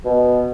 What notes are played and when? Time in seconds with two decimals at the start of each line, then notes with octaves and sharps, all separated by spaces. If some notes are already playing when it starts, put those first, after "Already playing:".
0.05 B2